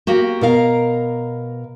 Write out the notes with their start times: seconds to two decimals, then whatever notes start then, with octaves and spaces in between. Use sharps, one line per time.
0.07 A#3 F#4 G4
0.41 B2 A#4 F5 A#5